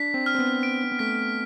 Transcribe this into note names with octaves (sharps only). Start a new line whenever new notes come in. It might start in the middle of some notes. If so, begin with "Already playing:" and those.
Already playing: D4 B6
C4
F6
C4
B3
D7
C4
B3
A3 B6